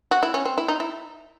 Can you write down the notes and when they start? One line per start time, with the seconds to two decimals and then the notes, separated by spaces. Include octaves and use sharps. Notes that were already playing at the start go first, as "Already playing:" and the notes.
0.11 F#4
0.23 E4
0.34 C#4
0.45 C4
0.58 E4
0.68 D#4
0.80 E4